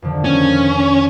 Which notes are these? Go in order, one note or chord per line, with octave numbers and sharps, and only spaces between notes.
F2 D3 D#3
C#4